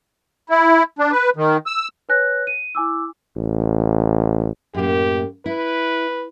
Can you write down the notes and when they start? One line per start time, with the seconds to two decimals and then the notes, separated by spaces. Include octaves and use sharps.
0.50 E4
0.99 D4
1.12 B4
1.36 D#3
1.66 E6
2.09 B4 C#5 G#5 F#6 A#6
2.47 D#7
2.75 E4 G#5 D6 E6
3.37 A1
4.74 F#2 A2 A#3 G4
5.46 E4 B4